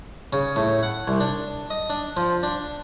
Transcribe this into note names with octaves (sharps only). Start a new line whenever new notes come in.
C#3
A2
F#5
C2
D4
D#5
D4
F3
D4